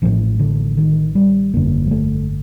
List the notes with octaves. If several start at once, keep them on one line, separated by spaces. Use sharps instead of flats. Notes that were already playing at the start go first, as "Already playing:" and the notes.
A1 A2 F3
D3
D#3
G3
G1 F2 D3 A#3
G3
A3